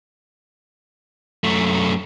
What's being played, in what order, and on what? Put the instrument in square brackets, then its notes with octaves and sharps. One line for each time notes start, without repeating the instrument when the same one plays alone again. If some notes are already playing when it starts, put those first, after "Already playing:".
[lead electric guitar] F#2 A3